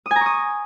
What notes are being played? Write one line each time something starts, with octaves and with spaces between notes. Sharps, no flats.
D#6
G#5
A#5
C#6
D#6